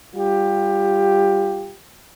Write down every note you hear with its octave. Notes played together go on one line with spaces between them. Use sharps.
G3 F4 G4